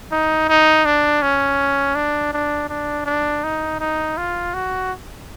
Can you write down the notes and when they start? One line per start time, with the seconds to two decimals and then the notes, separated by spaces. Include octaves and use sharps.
0.12 D#4
0.49 D#4
0.85 D4
1.22 C#4
1.95 D4
2.33 D4
2.69 D4
3.06 D4
3.44 D#4
3.80 D#4
4.17 F4
4.54 F#4